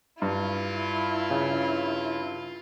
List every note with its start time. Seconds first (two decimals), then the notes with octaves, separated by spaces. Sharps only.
0.22 G2 E4 F4
1.31 C#3